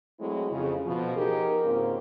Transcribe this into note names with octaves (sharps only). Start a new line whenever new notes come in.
F#3 G#3 A3 C4 E4
F2 C#3
B2 F3
D#4 G4 G#4 A#4
G#2 C#3 A#3 C4 F4